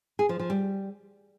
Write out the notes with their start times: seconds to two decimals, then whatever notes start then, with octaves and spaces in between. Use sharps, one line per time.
0.19 G#4
0.29 F3
0.39 F3
0.50 G3